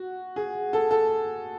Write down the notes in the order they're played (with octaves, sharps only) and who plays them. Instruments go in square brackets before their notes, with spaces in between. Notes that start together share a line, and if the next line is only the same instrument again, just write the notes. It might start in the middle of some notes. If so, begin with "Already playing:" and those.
Already playing: [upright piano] F#4
G#4
A4
A4